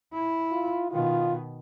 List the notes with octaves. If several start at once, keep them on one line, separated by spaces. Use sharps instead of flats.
E4
F4
B2 D#3 F4